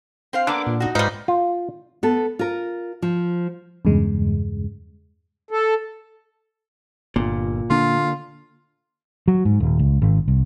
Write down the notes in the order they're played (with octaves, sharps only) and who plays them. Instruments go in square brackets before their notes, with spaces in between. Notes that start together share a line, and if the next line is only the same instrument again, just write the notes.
[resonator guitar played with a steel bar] C4 C5 F5
[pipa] D3 [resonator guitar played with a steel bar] A#3 B3 D4 [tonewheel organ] D6
[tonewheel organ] A#2
[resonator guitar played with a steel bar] D#4 F#4
[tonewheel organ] G#2 [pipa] G3 D#4 [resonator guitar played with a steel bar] F4 B4 C5
[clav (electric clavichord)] F4
[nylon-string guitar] B3 A4
F4 A#4
F3
[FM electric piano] E2 G2 C#3 G#3
[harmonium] A4
[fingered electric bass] G1 [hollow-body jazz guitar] A#2
[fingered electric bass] D3 A#3 D4 [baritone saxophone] F4
[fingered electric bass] F#3
G#2
D#1
C#2
G#1
C2